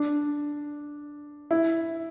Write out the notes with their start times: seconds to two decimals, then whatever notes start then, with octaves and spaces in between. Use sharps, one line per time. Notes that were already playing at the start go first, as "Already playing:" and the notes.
Already playing: D4
1.51 E4